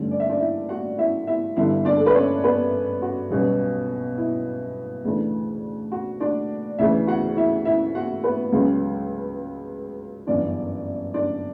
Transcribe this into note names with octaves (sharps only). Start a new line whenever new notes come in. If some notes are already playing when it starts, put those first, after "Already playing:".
Already playing: G2 D3 A3 C#4
D5
E5
D4 D5
E4 E5
F#4 F#5
E4 E5
E4 E5
G1 G2 D3 E4 E5
D4 D5
A4
B4
C#4 C#5
B3 B4
F#4
B1 B2 G3 C#4
E4
D2 C#3 E3 A3 D4
F#4
D4 D5
D2 C#3 E3 E4 E5
F#4 F#5
E4 E5
E4 E5
F#4 F#5
B3 B4
C#2 C#3 F#3 C#4
G1 F#2 E3 D4 D5
D4 D5